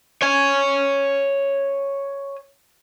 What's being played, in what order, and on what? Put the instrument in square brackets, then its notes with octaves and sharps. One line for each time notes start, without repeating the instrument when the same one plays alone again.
[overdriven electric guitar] C#5 G#5